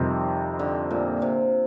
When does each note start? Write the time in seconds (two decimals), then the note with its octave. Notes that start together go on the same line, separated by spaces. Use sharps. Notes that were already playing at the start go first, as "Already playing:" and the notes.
Already playing: F2 C3 D#3 G3 C4
0.59 D3
0.91 A#2
1.22 C3